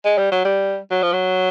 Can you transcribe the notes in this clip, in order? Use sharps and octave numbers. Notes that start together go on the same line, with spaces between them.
G#3
G3
F#3
G3
F#3
F3
F#3